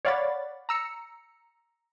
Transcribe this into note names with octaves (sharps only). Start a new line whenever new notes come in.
C#5 D5 F5 F#5 B5 A6
A#5 E6 C#7